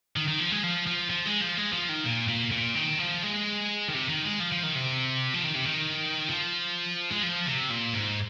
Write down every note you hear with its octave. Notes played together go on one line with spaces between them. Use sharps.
D#3
D#3
F3
G#3
F3
F3
F3
G#3
F3
G#3
F3
D#3
A#2
A#2
A#2
D#3
F3
G#3
D#3
C3
D#3
G#3
F3
F3
D#3
C3
F3
D#3
C3
D#3
F3
G#3
F3
C3
A#2
G#2